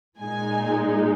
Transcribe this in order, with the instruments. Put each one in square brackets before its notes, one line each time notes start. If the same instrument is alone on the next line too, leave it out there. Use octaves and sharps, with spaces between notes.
[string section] A#2 G#3 D#4 G#5